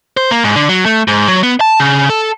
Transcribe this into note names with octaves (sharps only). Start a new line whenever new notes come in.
C5
A#3
G#2
D3
F#3
A3
G#2
F#3
B3
A5
C#3
A4